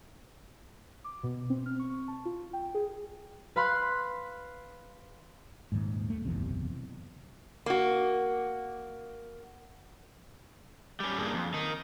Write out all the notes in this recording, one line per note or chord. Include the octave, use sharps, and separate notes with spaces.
D6
B2
C4
F6
C#6
A5
F4
G5
G#4
B4 F5 B5 C6 F#6
D#1 D#2 G#2
A3
F#1 B1 E2 C3
A#3 F#4
G3 C#4
G2 A#3 D4 G#4 A#4
F2
D#3 D#4